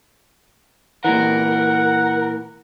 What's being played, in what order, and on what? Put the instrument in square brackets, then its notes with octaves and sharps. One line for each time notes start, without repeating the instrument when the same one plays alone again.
[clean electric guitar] A#2 E3 [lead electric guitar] A#4 [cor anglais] F#5